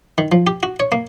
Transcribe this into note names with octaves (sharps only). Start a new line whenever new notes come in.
D#3
F3
G4
F#4
C#5
A#3